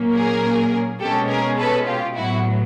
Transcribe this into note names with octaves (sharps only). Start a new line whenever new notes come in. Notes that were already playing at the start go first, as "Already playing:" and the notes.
Already playing: A#2 F#3 A#3 C#4
G#4 A#4
B2 G#3 C#4 G4 A4
G#4 A#4
A4 B4
F4 G4
A2 F#3 B3 E4 F#4